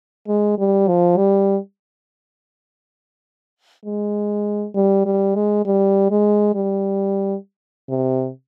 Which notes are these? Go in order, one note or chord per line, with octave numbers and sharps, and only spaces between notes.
G#3
G3
F3
G3
G#3
G3
G3
G#3
G3
G#3
G3
C3